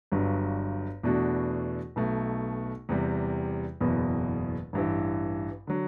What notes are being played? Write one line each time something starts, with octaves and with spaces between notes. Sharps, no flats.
G1 G2 F#3
E2 B2 A3 D4 F#4
B1 B2 A3
E2 C3 G3
F#1 E2 B2
A1 G2 E3
D3 F#3